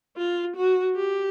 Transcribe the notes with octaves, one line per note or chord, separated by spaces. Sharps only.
F4
F#4
G4